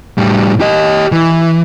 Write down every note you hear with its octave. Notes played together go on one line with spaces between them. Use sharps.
A2 G3
G4 D#5
E3